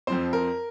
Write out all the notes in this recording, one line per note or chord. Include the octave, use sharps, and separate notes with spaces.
F2 F3 C4 C5
A#4